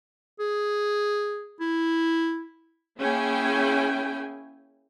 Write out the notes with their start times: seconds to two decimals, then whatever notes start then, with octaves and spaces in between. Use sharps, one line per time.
0.40 G#4
1.60 E4
3.00 A#3 C#4 E4 G#4 G5 G#5